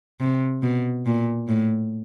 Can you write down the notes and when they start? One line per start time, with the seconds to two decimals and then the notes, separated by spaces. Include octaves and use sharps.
0.20 C3
0.63 B2
1.06 A#2
1.48 A2